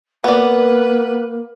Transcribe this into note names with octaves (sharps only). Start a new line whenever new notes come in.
A#3 B3 B4 D5